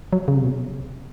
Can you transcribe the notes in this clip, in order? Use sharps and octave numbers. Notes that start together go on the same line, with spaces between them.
F#3
C#3
C3
B2